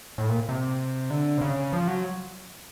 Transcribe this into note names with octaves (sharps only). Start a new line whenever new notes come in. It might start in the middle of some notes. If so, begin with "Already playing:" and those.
A2
A#2
C3
D3
C3
C#3
F3
F#3